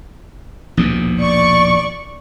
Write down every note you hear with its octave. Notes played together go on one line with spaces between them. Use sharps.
A#1 D#2 B2
D5 C#6